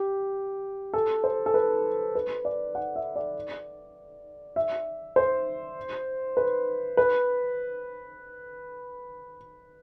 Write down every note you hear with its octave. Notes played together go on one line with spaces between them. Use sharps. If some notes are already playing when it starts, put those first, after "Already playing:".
Already playing: G4
A4
C5
A4
B4
B4
D5
F#5
E5
D5
E5
C5
B4
B4